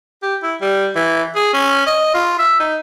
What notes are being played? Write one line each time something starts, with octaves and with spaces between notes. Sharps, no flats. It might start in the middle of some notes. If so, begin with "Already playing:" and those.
G4
E4
G3
E3
G#4
C#4
D#5
F4
E5
D#4